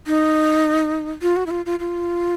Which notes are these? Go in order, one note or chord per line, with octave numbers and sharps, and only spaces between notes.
D#4
F4
F#4
E4
F4
F4
F4